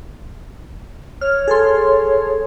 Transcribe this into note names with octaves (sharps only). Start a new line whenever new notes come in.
C#5 F6
G#4 A4 C6